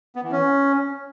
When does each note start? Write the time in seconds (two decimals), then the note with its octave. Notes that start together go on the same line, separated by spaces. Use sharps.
0.16 B3
0.24 E3
0.31 C#4